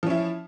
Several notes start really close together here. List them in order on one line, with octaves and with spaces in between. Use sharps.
F3 C#4 E4